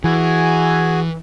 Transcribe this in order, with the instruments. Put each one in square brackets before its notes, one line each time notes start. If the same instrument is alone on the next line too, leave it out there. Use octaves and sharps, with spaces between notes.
[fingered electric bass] E3 [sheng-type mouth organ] F#4 G#4 G#5